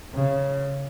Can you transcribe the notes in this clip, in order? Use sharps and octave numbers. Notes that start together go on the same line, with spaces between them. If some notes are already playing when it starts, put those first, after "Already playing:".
C#3